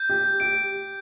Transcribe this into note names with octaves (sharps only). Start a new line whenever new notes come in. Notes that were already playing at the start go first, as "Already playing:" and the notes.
Already playing: G6
G4
G4 D7